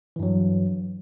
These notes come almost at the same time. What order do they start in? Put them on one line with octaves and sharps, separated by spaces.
E3 G2 F#3